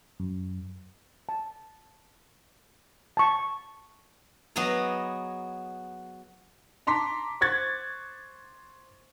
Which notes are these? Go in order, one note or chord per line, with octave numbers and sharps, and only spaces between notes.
F#2
A5
A5 C#6
F#3 B3 G#4 D#5 A#5
A5 A#5 C6 D6 B6
C5 C#6 F#6 G#6 A6